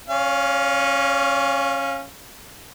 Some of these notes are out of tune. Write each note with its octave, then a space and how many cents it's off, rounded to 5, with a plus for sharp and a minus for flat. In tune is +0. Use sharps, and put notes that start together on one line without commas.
C#4 -15 C#5 +40 F5 +0